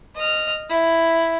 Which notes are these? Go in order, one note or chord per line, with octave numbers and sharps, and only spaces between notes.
D#5 F6
E4